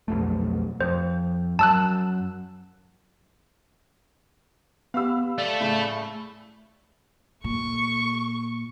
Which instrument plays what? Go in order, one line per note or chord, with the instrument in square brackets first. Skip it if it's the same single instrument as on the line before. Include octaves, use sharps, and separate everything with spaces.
[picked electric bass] B1 F2 A3
[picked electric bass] F2 [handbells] C5
[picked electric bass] F#2 F#3 [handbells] A5 E6 F#6
[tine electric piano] B3 G4 [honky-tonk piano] F5 B5 E6
[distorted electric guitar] A3 A4 [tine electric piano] D5 F5
[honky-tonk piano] A2 C#3
[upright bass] A#2 [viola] C#6